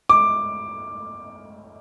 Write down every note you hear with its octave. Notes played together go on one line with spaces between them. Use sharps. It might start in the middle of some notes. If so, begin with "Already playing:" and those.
D6